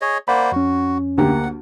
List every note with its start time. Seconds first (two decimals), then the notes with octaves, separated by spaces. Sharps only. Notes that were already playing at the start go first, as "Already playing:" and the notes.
0.01 G#4 C#5 D#5
0.28 A#3 C5 D5 F#5 B5
0.52 F2 C#4 F#4
1.18 D2 A#3 G4 F#5